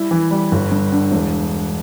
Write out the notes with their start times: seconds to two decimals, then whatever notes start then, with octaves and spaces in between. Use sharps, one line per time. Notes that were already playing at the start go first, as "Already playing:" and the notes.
Already playing: G3 E4
0.11 E3
0.31 G3
0.52 G1
0.71 G2
0.92 D3
1.12 E1